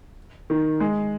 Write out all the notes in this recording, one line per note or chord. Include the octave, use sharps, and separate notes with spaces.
D#3
G#3